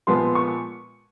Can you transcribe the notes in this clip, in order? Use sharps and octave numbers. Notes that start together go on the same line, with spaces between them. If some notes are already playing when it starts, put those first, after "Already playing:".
A#2 F3 G#3 B3 C6
C#6